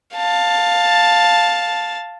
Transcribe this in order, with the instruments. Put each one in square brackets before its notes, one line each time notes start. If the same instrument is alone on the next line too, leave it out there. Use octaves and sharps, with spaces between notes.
[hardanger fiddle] F5 A5